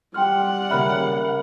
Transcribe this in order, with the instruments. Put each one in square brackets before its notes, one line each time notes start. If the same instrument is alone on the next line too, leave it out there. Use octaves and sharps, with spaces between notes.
[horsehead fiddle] G3 F#5 [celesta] G5 C6 F6
[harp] C#3 A#3 C#4 [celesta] E5 B5 F6